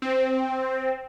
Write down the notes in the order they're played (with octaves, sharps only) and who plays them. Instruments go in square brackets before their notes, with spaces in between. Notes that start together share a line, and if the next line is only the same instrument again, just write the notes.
[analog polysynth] C4